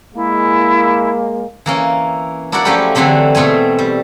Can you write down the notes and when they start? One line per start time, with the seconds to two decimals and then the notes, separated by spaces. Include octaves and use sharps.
0.15 G#3 A#3 E4
1.66 E3 A#3 C#4
2.52 D4 E4 F#4 A#4 D5 F#5
2.65 F3 F#3 A3 C#4 E4 G4
2.95 D3 E3 F#3 A3 C4 D4
3.35 B2 A3 C4 G#5
3.79 G3